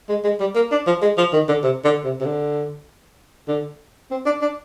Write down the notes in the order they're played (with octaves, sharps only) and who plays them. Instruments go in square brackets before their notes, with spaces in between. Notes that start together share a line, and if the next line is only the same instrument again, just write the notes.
[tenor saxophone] G#3
G#3
G3
A#3
D4
F3
G#3
F3
D#3
D3
C3
D3
C3
C3
D3
D3
C4
D4
D4